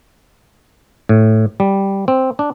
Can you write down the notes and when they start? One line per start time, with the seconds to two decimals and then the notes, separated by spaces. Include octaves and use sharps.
1.09 A2
1.60 G3
2.08 C4
2.39 D4